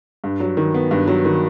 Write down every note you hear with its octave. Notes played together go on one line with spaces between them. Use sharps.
G2
F#3
D#3
B3
G2
F#3
D#3